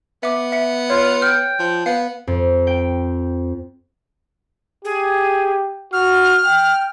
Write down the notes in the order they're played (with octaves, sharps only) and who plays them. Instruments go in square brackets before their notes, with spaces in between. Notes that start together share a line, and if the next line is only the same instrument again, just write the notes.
[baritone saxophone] B3 [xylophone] E5 D6
[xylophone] E5 C#7
[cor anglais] F4 [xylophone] C#5
[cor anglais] G5 [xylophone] F6
[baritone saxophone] F3
[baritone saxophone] B3 [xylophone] F5
[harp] F2
G5
[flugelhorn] G4 [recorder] G#4
[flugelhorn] F#4 [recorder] F6
[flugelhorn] G5